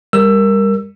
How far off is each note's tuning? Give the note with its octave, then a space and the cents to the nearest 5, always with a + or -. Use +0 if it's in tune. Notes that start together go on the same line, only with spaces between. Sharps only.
G3 +30 A#4 +0 E6 +20